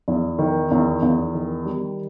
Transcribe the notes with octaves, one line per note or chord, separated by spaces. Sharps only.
E2
D#3
E2
E2
D#3
G3